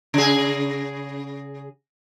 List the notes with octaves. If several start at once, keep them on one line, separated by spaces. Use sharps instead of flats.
C#3 G#4